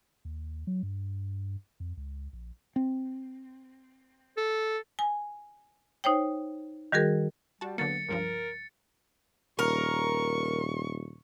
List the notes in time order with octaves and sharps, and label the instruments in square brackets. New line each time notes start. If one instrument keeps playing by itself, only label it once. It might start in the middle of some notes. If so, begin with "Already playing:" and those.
[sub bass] D#2
F#3
G2
F2
C#2
A#1
[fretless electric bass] C4
[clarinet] A4
[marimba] G#5
D#4 C5 C#5 G5
D#3 G3 F#4 G#4 A#4
[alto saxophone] G3 [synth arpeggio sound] F#4 A5
[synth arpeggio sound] D3 F#3 A#3 [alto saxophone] B3 [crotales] A6 C#7
[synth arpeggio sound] C#2 G2 F3 [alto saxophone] A#4
[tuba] D#1 [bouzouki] A#4 [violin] C#6